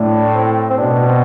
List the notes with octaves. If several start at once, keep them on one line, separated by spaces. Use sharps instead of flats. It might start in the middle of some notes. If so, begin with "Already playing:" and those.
Already playing: A2 D4
C4
C4
B2 D4
C4